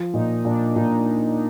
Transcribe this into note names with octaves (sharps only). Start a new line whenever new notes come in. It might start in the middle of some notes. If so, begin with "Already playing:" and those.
Already playing: F3
A#2 D#4
A#2 D4
A#2 D#4